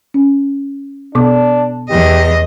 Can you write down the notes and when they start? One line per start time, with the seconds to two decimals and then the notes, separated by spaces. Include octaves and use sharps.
0.14 C#4
1.15 B2 B3 D4 D6
1.90 E2 G4 D#5